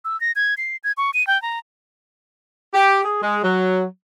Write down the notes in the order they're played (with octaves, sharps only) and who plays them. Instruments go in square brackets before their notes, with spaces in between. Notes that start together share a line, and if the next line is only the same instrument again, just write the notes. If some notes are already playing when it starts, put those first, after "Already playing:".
[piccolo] E6
A#6
G#6
C7
G#6
C#6
D#7
G5
A#5
[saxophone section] G4
G#4
G#3
F#3